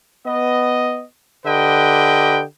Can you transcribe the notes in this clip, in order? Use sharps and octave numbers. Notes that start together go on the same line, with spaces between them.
B3 D#5
D3 G4 B4 D#5 G5